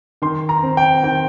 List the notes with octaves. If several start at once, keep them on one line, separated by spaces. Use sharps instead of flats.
D#3 C6
A#5
C4
G5
D#3 G5